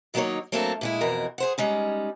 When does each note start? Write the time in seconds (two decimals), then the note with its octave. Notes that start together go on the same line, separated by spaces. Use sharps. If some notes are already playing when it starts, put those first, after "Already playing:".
0.14 D#3 F#3 G3 A#3 D#4 C#5
0.52 F#3 A3 A#3 C4 D4 A4
0.81 A#2 G#3 E4
1.01 F2 B2 E3 A#4
1.38 G#4 C5 F#5
1.58 G3 G#3 C#4 D#4